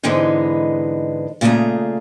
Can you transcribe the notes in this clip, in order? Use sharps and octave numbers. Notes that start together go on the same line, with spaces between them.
G#2 D3 E3 G#3 B3 D#4
A#2 C#3 A3 G#4 A#5